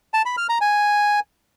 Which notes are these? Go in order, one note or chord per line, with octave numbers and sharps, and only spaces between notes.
A5
B5
F6
A#5
G#5